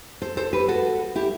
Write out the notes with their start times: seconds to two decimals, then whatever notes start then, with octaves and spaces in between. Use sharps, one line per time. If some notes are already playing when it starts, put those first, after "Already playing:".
0.22 A4 C5
0.37 A4 C5
0.53 G4 B4
0.68 F#4 A4
1.15 E4 G4